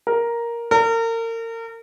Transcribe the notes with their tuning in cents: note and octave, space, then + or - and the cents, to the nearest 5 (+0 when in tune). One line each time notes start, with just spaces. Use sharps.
A#4 +5
A#4 -35